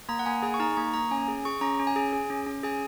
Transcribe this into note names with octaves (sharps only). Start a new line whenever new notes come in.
A#3 A#5
F#5
A#3 G#5
G#4 G#5
C#6
D#4 A#5
A#3 C#6
A#3 A#5
C#4 G#5
G#4
G#4 C#6
C#4 A#5
C#4
G#5
G#4
G#4
C#4
C#4
G#4 G#5